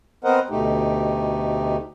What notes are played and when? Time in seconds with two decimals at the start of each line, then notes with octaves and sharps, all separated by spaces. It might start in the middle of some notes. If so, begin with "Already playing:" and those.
0.24 B3 C4 A#4 C5 D#5 F#5
0.50 D2 B2 A3 D#4 G4